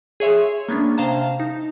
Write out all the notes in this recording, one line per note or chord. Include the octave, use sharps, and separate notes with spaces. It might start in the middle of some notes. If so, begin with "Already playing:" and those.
G#4 C#5 E5 C6
A#3 B3 C#4 D4
C3 C5 F5 A5 A#5 E7
D#4